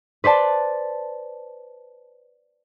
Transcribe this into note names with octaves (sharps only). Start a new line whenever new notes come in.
B4 C5 D5 A5